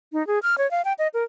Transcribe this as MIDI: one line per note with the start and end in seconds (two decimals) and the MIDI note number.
0.13 0.26 63
0.27 0.39 68
0.43 0.55 89
0.58 0.69 73
0.71 0.82 77
0.85 0.93 79
0.99 1.08 75
1.14 1.24 70